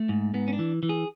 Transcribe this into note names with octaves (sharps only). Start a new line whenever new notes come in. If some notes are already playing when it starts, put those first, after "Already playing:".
Already playing: A3
G#2
G#2 B3
C#4
D4
E3
E3
G#4